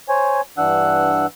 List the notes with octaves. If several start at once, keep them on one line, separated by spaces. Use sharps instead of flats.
C5 C#5 G#5
G2 E3 D4 F#5 E6 F#6